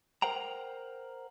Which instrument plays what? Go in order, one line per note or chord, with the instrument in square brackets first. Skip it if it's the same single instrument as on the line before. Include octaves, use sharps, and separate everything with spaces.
[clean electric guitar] A#4 C5 F#5 G5 A#5